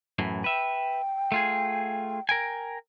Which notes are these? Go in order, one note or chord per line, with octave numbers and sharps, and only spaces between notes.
F#2 A2 E3
B4 E5 G5
A3 F4 G#4
A#4 G5 G#5